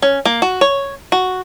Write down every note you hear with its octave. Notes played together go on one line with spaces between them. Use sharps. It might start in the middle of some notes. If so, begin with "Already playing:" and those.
C#4
A#3
F#4
C#5
F#4